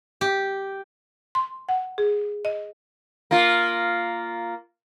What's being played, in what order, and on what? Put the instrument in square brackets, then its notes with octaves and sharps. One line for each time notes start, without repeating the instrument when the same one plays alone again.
[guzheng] G4
[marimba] C6
F#5
G#4
D#5
[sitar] A#3 F4